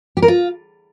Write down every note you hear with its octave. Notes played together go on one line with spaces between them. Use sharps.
G4
A#4
F4